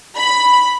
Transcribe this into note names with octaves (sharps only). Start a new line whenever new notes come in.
B5